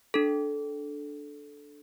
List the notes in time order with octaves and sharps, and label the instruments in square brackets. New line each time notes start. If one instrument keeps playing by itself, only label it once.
[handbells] D4 A4